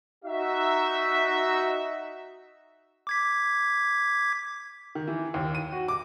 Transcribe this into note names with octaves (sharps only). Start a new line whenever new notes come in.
D#4 F#4 E5
D6 G#6 B6
D#3
E3
D#2
D#7
F#4
D6